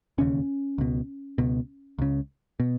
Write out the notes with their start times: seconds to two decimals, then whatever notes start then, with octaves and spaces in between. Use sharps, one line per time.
0.18 E1 D#2 C#3 C#4
0.78 C#2 B2
1.38 C#2 B2
1.99 C#2 C#3
2.60 B2